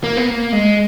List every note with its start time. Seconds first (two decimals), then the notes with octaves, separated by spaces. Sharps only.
0.04 A#3
0.17 B3
0.30 A#3
0.52 G#3